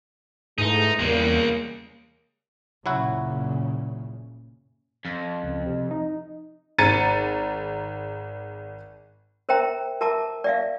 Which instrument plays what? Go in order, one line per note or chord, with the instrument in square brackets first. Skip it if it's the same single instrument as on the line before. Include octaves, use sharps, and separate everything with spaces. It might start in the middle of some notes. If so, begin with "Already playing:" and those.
[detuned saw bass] G#2 [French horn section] E3 A3 [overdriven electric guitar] D#4
[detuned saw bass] E2 [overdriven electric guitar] C#3 G#3 [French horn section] G3 A#3
[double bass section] F#1 A#2 C#3 [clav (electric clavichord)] F#3 E4 F#4
[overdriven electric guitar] F2
[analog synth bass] C#2
C3
D#4
[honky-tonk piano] G#1 A#5 A6 C#7 D#7
[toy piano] A#4 C5 E5 G5 A#5
A#4 E5 A5 A#5 D6
D5 E5 F5